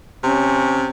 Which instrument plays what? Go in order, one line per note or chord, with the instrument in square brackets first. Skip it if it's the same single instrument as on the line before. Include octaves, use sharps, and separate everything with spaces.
[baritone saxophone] C3 [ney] C#4